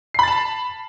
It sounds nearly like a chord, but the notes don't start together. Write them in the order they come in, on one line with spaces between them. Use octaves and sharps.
C7 B5 A6 A5